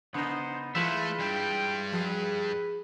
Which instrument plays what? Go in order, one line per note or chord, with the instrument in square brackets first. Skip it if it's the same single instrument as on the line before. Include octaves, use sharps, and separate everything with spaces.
[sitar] C#3 [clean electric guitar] B3 D#4 [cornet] C5
[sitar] E3 G#3 B4 [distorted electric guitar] A3 [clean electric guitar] E4 F4 E5 [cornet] B5
[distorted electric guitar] G2 G3 [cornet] G5
[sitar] F3 G#4 [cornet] B4